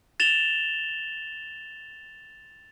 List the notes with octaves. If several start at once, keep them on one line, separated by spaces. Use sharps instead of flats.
A6 E7 F7 G7